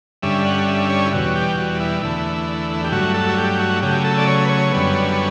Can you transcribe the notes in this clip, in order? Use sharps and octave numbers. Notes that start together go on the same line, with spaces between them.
G2 D3 G3 C#4 E5
F#5
E5
C#5
E4
E2 B2 G3 F#4
G4
F#4
E4
E2 D3 A3
G4
G2 F#3 A3 F#4
A4
F#4
G4
F#4
C#3 F#3 A3 G4
A4
D5
C#5
B4
C#5
F#2 D3 G3 B3